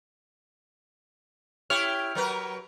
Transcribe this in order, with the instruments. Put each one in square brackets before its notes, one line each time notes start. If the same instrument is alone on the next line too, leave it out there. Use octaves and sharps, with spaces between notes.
[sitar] E4 G4 C#5 [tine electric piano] F6
[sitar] F#3 A#4 B4